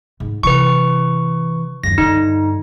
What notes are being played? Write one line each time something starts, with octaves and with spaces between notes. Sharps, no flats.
G#2
C3 E3 B4 C#6
F#1 D#2 A#6
G2 D3 D#4